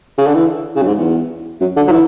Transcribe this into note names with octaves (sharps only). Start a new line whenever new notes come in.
C#3
D3
E3
C#3
F#2
G#2
E2
F#2
D3
F#3
E3